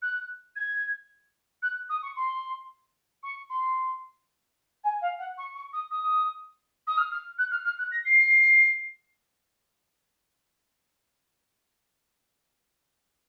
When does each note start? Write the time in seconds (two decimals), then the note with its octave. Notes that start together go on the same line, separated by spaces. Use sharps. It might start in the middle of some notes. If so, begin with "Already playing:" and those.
0.02 F#6
0.56 G#6
1.62 F#6
1.89 D#6
2.02 C#6
2.16 C6
3.23 C#6
3.50 C6
4.84 G#5
5.01 F5
5.19 F#5
5.38 C#6
5.55 C#6
5.73 D#6
5.91 D#6
6.87 D#6
6.97 F6
7.11 F6
7.38 F#6
7.51 F6
7.65 F6
7.78 F#6
7.91 A#6
8.05 C7